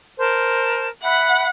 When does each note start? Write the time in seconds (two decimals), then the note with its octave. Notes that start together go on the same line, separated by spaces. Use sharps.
0.18 A#4 C5 A5
1.04 E5 F#5 B5